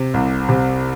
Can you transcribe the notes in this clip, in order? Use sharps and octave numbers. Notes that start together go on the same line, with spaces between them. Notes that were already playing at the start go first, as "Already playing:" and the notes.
Already playing: C3
C2
C3